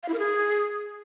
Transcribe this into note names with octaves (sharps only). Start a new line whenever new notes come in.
F5
E4
A#4
G#4